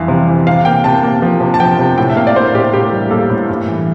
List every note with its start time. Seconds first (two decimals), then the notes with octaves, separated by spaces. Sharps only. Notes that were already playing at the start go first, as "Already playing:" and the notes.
Already playing: F2 E3 G3 E5 F5
0.08 C3
0.28 E3
0.47 C3 F5
0.65 A#3 G5
0.84 C3 A5
1.03 A#3
1.22 F3
1.41 C3
1.54 A5
1.60 F3 G5
1.79 C3
1.98 A2 G5
2.10 E5
2.16 A#3 F5
2.27 D5
2.36 A2 C5
2.54 A2 G4
2.73 A2 G4
2.93 G3
3.11 A#3 A4
3.30 A2
3.49 G2
3.68 E3